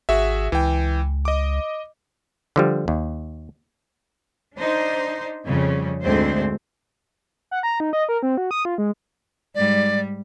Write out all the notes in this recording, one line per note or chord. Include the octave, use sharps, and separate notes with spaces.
G#1 F#4 G#4 E5
C#2 E3 G5
D#5 D6
D3 F3 G3
D#2
D4 D#4 C5
F2 C#3 G3
D2 G#2 D3 G#3 C4 C5
F#5
A#5
D#4
D#5
A#4
C4
F#4
D#6
F4
G#3
G#2 G3 D5